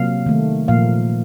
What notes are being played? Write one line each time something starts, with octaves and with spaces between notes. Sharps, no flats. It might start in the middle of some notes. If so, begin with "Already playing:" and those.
Already playing: C3 F#3 A#3 F5
D#3 A3
A#2 F3 A#3 F5